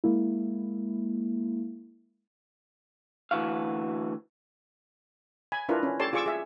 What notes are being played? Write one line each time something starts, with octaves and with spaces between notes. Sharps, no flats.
G#3 A#3 E4
D2 E3 F#4 F5
G#5 B5
D4 E4 F4 A#4 B4
C#4
G4 A4 C#5 D5 A5 C6
F4 G#4 D5 C#6 D6 E6
G#4 E5